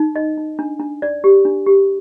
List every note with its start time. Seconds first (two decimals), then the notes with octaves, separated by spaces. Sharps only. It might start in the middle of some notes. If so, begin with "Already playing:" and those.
Already playing: D#4
0.16 D#5
0.37 D#4
0.59 D4
0.80 D4
1.02 D5
1.24 G4
1.45 D4
1.66 G4